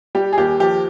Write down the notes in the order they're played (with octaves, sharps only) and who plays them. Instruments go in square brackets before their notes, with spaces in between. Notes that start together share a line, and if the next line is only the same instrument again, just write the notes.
[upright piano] G3 G4
G#4
D#2 G4
F3 G4